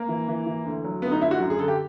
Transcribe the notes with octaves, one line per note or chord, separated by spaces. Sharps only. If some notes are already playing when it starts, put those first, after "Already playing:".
Already playing: A#3
E3
E3
E3
D2
F#3
D2 B3
D#4
D2 E4
F#4
F#2
G#4
D3 A4
G4